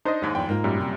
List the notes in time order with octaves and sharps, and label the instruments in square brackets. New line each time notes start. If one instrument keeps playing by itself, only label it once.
[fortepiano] D4 C5 [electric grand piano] D#4 D#5
[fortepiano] D#2 G#2 [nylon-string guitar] C5
[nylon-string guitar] E2 F3 [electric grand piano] G5
[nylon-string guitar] G#2 F4 [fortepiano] A#3
[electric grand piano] F#2 A#2 G3
[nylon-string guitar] C3